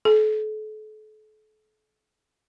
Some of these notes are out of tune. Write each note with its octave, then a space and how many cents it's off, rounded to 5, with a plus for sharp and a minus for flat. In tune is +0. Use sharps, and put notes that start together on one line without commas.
A4 -35